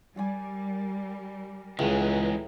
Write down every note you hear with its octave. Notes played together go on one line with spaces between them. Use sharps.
G3 G#4 A#4 D5 G#5
C#2 A2 E3 G#3 A#5 C#6